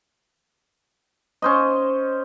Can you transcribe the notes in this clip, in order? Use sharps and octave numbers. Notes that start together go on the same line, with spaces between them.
C#4 C5 D#5